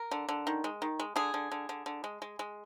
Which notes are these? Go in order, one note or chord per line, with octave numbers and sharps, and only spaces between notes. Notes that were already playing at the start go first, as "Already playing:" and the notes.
Already playing: A#4
D3
D3
D#3
G#3
D#3
G#3
D3 G#4
D3
D3
D3
D3
G#3
G#3
G#3